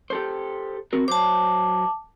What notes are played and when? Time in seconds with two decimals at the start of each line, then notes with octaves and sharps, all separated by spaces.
0.10 G4 A4 C5
0.93 C4 F#4 A#4
1.08 F#3 C5 A5 D6